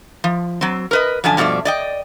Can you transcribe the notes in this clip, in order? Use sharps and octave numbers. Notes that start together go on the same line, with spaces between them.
F3
F#3 C4
A#4 B4 D#5
F#2 D3 F3 G#5 A5
G2 B2 F3 A3 D5
D5 D#5 G5